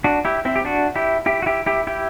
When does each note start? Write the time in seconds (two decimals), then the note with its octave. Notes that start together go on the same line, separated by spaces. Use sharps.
0.04 D4 F#4
0.25 E4 G4
0.45 C4 E4
0.56 G4
0.65 D4 F#4
0.96 E4 G4
1.26 E4 G4
1.42 F#4
1.46 E4 G4
1.66 E4 G4
1.87 E4 G4